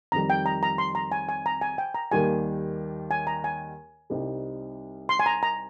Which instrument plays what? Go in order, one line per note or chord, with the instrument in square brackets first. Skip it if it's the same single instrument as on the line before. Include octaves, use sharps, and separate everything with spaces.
[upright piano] F2 D#3 G3 [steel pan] A#5
[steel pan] G5
A#5
A#5
C6
A#5
G#5
G#5
A#5
G#5
G5
A#5
[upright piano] D#2 D#3 G3 A#3 [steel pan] G#5
[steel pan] G#5
A#5
G#5
[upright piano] C2 C3 G3 C4 D#4
[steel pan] C6
G#5
A#5
A#5